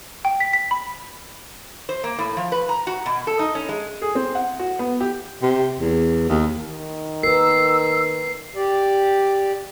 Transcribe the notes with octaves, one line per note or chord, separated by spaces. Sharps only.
G5
B6
B6
B5
C5
A#3
A2
F3
B4
A#5
F#4
B2
A4
D#4
C#4
G#3
G#4
C4
F#5
F#4
B3
G4
C3
E2
D#2
D#3
A#4 B4 E6 C7
G4 D5